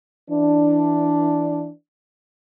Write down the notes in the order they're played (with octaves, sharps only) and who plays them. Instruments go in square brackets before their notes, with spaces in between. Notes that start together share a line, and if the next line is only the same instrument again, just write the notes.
[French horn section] E3 D4